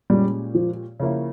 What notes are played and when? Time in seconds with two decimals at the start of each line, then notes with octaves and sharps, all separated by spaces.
0.10 A#2 G3 G#3 C#4 G4
0.55 F3
1.00 C#3 F3 A#3 E4